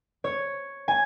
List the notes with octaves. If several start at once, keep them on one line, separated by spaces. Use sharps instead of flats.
C#5
G#5